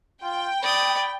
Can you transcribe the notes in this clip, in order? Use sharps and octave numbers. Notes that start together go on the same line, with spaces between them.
F4 G5
D5 B5 D#6